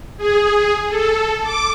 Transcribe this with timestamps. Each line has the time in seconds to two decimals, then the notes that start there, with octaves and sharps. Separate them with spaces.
0.17 G#4
0.88 A4
1.43 D6